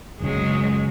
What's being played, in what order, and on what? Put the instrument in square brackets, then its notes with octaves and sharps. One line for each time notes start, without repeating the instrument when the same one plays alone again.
[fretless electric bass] F#1 C#2 [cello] F#3 G#3